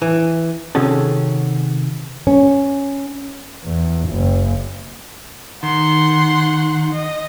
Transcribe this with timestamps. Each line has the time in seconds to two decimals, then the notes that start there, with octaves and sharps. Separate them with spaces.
0.02 E3
0.75 C3 D#3 C#4 F#4 G#4 A4
2.27 C#4
3.64 E2
4.10 F#1
5.63 D#3 F#5 C6
6.92 D#5